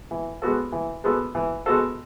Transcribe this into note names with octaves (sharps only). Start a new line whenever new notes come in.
E3
G#3 B3 F#4 A4
E3
G#3 B3 F#4 A4
E3
G#3 B3 F#4 A4